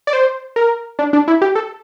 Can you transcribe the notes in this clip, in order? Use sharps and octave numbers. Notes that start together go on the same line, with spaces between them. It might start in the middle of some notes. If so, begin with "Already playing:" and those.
D5
C5
A#4
D4
D4
E4
G4
A4